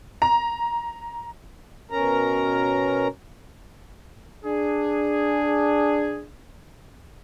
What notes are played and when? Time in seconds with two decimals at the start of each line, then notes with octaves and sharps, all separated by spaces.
0.22 A#5
1.91 B2 C#4 A#4 A#5
4.45 D4 G#4